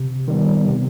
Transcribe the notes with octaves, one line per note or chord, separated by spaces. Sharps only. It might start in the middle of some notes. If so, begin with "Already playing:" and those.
Already playing: C3
D#3 G3 B3
C3